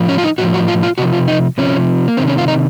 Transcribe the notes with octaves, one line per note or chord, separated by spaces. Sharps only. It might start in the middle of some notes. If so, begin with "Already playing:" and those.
Already playing: A2 F3
C#4
F4
D#4
A2 F3 F#4
F#4
F4
F4
C3 F3 F#4
F4
D#4
C3 F3 C#4
A#3
C3 D#3 C4
C#4
F4
D#4